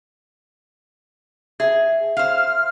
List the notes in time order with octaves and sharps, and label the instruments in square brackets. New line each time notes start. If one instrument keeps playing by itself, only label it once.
[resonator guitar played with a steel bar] G#4 [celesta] E5
[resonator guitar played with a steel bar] C5 F5 [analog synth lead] F6